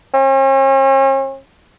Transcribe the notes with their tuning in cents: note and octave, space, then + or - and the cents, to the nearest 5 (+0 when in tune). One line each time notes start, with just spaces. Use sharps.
C#4 -45